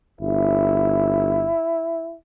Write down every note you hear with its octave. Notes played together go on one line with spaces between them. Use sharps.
G1 E4